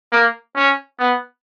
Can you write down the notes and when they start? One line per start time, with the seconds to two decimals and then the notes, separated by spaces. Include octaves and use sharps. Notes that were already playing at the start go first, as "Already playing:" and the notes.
0.12 A#3
0.56 C#4
0.99 B3